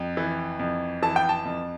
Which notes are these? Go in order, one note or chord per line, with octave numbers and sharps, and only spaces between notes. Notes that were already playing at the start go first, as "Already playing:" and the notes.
Already playing: F2
E3
F2
E3 A5
G5
A5
F2